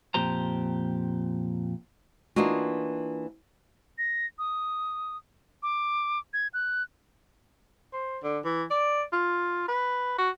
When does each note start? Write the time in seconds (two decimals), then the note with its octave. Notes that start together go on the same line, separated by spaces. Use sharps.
0.14 F2 A#2 G4 C5 A#5
2.36 E3 A#3 D4 D#4 F4 F#4
3.98 A#6
4.39 D#6
5.63 D6
6.34 G#6
6.54 F#6
7.93 C5
8.23 D3
8.45 E3
8.70 D5
9.13 F4
9.68 B4
10.18 F#4